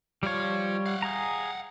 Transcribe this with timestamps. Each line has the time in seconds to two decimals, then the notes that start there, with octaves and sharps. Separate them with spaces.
0.23 F3 G3 C#5 F5
0.86 F5 F#5
1.02 G#4 A#5